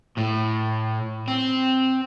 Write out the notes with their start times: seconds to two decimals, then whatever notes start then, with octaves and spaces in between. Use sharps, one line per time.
0.17 A2
1.28 C4